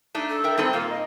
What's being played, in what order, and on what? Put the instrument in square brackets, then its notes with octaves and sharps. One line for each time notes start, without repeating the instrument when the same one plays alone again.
[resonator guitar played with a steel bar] A3 D4 D#4
[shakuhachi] A4
[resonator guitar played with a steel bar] A#4 E5 G5
[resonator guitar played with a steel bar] G3 D#4 A4 [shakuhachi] C4
[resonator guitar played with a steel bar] A#2 A#3 [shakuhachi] F4
[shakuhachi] D#5